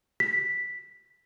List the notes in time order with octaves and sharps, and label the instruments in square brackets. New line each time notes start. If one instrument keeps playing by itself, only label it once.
[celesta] B6